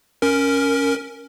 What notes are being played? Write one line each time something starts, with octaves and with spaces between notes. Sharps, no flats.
C#4 A#4